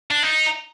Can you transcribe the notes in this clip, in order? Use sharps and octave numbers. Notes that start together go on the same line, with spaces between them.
D4
D#4